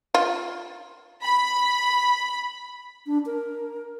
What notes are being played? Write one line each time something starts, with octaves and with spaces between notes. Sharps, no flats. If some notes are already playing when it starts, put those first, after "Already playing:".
F4
B5
D4
A#4